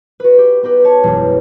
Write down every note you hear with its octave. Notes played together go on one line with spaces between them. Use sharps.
F#4 B4
G4
B3 D#4 G4 B4
C#5 A5
E1 F#2